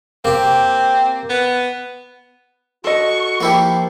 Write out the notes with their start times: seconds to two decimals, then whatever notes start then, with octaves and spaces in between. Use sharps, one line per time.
0.25 A#3 C4 G4
1.30 B3
2.84 F#4 A4 D#5 C#6
3.41 F3 A#3 E4 G4